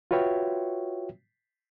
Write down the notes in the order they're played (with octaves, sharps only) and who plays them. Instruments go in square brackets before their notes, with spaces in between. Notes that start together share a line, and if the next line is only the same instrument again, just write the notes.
[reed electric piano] F4 F#4 B4 C#5 E5 G5